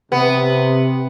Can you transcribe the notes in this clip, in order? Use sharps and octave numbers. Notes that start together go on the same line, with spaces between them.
C3 B3